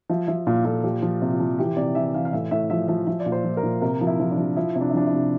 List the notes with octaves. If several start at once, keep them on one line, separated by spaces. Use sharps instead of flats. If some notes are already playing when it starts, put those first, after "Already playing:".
F3 E5
F3 E5
A#2 F5
A#2 A4
F3 G4
F3
C3
F4
F3
E3 G4
C3 D5
E3 E5
E3 F5
F5
A2 E5
A2 E5
F3 E5
F3 E5
F3 E5
D5
A#2
C5
F3
A#4
A#2
C3 A#4
F3
E4
F3
D4
F3
F3 E4
C3
D4
E4
F3 D4
E4
C3